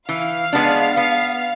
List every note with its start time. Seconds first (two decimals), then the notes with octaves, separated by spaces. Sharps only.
0.08 E3 F5
0.53 G#3 B3 D4
0.97 B3